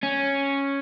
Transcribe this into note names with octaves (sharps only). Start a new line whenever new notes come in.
C#4